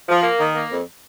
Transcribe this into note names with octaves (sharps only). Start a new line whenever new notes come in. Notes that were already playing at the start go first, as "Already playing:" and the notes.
F3
A#3
D#3
A#3
F2